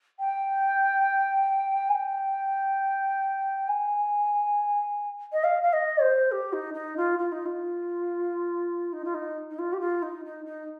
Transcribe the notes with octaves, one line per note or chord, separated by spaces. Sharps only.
G5
G#5
G5
G#5
D#5
F5
F5
D#5
C5
G4
D#4
D#4
F4
F4
D#4
F4
D#4
F4
D#4
D#4
F4
G4
F4
D#4
D#4
D#4